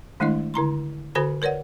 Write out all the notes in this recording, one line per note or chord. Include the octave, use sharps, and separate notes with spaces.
D#3 G#3 A3 D4 E4 D#5
D3 E4 A#5 C6
D3 F#4 A4 C5 G#5 B5
A#4 B4 C#5 D5 F#5